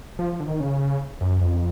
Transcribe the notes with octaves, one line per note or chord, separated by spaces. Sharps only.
F3
F3
D3
D#3
C#3
F#2
F2